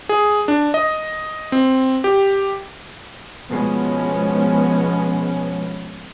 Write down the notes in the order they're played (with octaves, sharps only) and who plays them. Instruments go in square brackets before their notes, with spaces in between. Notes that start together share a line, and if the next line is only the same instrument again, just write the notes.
[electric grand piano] G#4
D4
D#5
C4
G4
[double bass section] B2 F3 G#3 B3 C#4